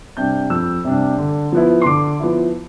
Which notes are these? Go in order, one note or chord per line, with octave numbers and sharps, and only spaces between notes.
C3 G3 D4 G6
F2 E6
C3 G3 D4
D3
F3 B3 E4
C6
D3 D6
F3 B3 E4